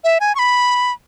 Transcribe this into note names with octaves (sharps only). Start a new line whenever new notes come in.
E5
G#5
C#6
B5